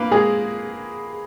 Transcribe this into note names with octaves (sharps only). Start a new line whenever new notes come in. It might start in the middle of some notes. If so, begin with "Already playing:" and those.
Already playing: A#3 A#4 B4
G#3 G#4